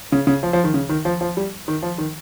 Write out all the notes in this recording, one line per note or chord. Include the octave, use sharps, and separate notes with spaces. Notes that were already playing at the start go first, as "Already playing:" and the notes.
C#3
C#3
F3
F3
D#3
C#3
D#3
F3
F3
G3
D#3
F3
D#3